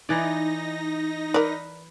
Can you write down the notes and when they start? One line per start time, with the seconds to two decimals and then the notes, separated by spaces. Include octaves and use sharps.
0.09 E3 D#4 D5 A#6
1.34 A#4 B4 D5